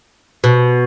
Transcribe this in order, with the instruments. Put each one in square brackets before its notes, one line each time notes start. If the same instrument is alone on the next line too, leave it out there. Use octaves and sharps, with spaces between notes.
[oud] B2